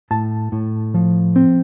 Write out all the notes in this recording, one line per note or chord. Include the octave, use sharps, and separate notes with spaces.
A2 A5
A2
F3
C4